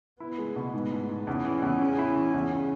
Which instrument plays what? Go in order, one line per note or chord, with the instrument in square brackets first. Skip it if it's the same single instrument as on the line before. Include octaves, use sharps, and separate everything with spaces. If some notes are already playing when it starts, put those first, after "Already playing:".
[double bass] B3 [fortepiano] E4
[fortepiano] G#3
B2
[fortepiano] G#2 [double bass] B3
[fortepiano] G#2
G#2
[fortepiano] E2 [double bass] C#4
[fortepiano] E3
E2
C#3
E4
E3
E2
C#3